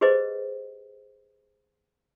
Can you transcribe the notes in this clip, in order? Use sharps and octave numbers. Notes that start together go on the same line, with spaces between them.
G4 G#4 B4 C5 D#5